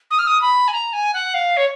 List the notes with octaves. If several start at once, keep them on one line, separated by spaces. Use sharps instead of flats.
D#6
F6
D#6
B5
G#5
A#5
G#5
F#5
F5
C#5